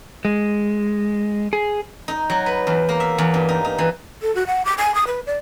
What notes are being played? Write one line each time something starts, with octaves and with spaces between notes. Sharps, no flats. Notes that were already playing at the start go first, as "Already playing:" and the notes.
G#3
G#4
D#4
F#3
B4
E2
A#3
E5
E2
G2
D#4
D#4
E3
A4
F#4
F#5
D6
G#5
D#6
B4
D5